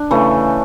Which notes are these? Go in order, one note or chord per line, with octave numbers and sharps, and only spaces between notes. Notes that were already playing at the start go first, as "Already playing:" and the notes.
Already playing: D4
C#3 E3 A3